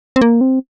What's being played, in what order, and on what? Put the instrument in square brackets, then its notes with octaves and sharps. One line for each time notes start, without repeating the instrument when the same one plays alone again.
[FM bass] C4
A#3
C4